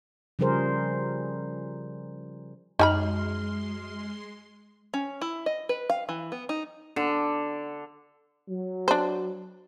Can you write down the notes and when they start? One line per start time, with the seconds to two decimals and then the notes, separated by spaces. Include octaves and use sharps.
0.39 C#3 F3 G3 G#4 A#4 C5
2.79 F#2 G#3 D#4 G#5 B5 C6 F6
4.94 C#4
5.21 E4
5.46 D#5
5.69 B4
5.90 F5
6.09 E3
6.32 B3
6.49 D#4
6.96 D3
8.49 F#3
8.88 D4 C5